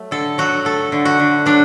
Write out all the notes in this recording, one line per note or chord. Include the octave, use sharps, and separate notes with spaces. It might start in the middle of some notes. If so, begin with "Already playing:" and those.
Already playing: F#3 A3
D3 A4
F#3 F#4
A3 A4
D3
F#4
D3
F#3 D4